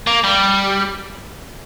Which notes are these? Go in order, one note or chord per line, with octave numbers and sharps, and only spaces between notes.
A#3
G3